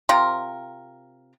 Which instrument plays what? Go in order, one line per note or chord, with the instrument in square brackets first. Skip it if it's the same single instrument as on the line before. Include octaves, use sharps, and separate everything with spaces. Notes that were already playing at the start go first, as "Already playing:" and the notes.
[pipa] C3 C4 F4 A#4